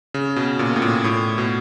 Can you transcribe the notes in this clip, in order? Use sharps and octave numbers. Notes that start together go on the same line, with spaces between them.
C#3
B2
A#2
A2
A#2
A2
B2